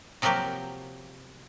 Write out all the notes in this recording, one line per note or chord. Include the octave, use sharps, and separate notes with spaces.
C3 F3 F#3 A#3 G4